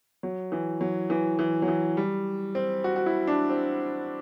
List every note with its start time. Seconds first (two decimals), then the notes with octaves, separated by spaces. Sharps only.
0.23 F#3
0.52 E3
0.81 F#3
1.10 E3
1.39 E3
1.62 F#3
1.68 E3
1.97 G3
2.55 C4
2.84 F#4
2.96 F#4
3.06 E4
3.27 D4
3.49 C4